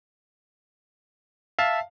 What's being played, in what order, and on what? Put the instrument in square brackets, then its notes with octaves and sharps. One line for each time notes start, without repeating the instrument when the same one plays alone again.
[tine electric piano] E5 A5 [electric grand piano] F5